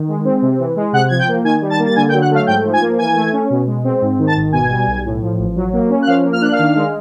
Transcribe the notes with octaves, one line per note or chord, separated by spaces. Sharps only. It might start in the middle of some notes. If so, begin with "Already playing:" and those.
Already playing: D#3
G#3
C4
C3
E3
G#3
C3 F#5 F#6
F3 G#6
G5 G6
A#3
D#3 G#5 G#6
G3
A5 A6
A#3
A6
D3 G#5 G#6
G5 G6
F#3
F#5 F#6
A3 F5 F6
G#2 G5 G6
F3
G#5 G#6
A#3
E3 G#5 G#6
A3
C#4
B2
G#3
C4
G#2
D#3
A5 A6
G#1
B2 G#5 G#6
G3
B1
A2
F3
A1
F#3
A#3
C#4
F#6
F3 F5 F6
A#3
F6
D4 F#6
F5 F6
D#3
G#3